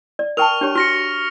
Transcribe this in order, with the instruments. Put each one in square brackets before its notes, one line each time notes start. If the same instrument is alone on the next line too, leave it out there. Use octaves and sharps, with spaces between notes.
[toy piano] D5
[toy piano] A#4 G5 A5 [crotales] C#6 F6 F7
[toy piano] D4 G4 C#5
[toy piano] F#4 [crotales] F6 A#6 C#7